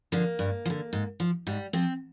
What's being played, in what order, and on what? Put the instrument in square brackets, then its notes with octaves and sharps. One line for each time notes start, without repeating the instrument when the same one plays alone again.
[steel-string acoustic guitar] D3 F3 A#3
G2
F3
D3
G#2
F3
G#2 G3
F3 C4